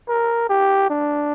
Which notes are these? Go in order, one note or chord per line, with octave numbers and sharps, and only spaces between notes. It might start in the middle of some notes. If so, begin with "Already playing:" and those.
A#4
G4
D4